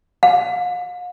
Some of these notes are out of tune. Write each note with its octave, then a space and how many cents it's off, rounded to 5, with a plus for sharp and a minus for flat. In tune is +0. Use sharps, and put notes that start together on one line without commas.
F5 +45